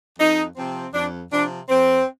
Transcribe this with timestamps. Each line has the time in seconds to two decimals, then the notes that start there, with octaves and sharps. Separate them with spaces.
0.19 F2 D#4
0.57 C3 F3 C4
0.94 F2 D4
1.31 C3 F3 C4 D4
1.69 F2 C4